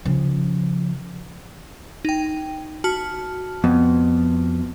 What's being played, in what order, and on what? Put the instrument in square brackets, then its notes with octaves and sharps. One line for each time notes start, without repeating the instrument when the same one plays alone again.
[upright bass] C#3 F3
[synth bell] D#4 G5
F#4 A5 F6
[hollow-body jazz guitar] F2 [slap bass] B3